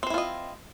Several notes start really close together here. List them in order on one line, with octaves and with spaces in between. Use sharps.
C4 C5 E4 F4 D#5